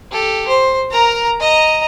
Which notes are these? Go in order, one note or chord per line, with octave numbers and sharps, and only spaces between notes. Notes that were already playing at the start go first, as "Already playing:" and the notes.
G4 A4
C5
A#4 A#5
D#5 A#5